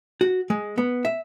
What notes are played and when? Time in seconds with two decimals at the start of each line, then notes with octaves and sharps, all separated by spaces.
0.21 F#4
0.50 G#3
0.78 B3
1.05 E5